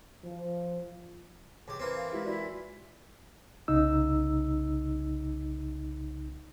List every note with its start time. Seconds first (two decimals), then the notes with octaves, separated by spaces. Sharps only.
0.24 F3
1.68 C#2 G4
1.79 E3 A#3 C4
1.96 F5
2.13 G#3 E4 F4 G4
2.25 E4 F#4 D5
3.68 C2 C#3 D#4 E6